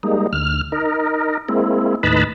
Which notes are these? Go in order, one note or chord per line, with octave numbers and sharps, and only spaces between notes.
G3 G#3 A#3 D#4
D2 F6
D#4 A#4
G#3 A#3 C4 E4
D#2 A2 D#4 B4 A5 B5